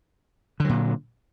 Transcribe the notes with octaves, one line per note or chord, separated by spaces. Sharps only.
A#2 D3 F#3